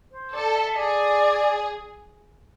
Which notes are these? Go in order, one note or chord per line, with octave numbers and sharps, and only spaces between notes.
C5
A4 D5
E5
G#4 D5